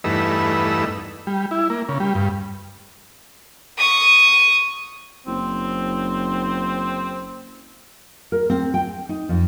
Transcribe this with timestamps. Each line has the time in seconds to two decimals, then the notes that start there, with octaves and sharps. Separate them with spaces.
0.04 E2 G2 A3 D#4 B4 E6
1.27 G3
1.51 E4
1.70 A#3
1.89 C#3
2.00 G3
2.15 G2
3.78 C#6 D#6
5.26 F#1 C4
8.32 A#4
8.50 C4
8.74 G5
9.09 D#4
9.29 F2